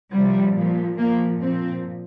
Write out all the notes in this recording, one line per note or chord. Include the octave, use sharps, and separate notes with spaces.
C3 F3 G3
A#2 F3
A#2 F3 A#3
A#2 F3 C4